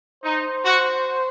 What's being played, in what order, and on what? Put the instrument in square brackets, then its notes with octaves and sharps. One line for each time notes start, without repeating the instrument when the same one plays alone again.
[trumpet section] D#4 [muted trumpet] C5
[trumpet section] F#4